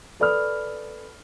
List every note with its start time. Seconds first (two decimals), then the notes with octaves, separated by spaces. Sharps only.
0.20 A4 B4 D5 B5 D#6 F6